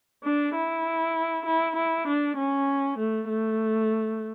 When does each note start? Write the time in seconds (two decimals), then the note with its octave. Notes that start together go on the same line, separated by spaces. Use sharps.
0.23 D4
0.55 E4
1.46 E4
1.76 E4
2.07 D4
2.37 C#4
2.98 A3
3.29 A3